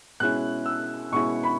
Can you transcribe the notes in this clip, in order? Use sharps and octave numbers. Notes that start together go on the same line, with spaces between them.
B2 G#3 C#4 E4 F#6
E6
B2 G#3 C#4 E4 C#6
B5